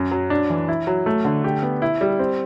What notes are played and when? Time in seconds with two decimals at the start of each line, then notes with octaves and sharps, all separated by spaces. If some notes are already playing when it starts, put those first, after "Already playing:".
Already playing: F#2
0.11 F#3
0.30 D4
0.50 E3
0.68 E4
0.87 F#3
1.06 A3
1.25 D3
1.44 G4
1.62 B3
1.82 E4
2.01 G3
2.19 C4